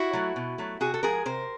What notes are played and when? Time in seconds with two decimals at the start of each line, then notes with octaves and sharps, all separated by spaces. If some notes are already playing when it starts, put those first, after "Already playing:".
Already playing: E4 F#4
0.13 F#3 A3
0.36 B2
0.58 F#3 A3
0.81 C3 F#4 G#4
0.94 A4
1.03 F3 G#3 G#4 A#4
1.26 C3 A#4 C5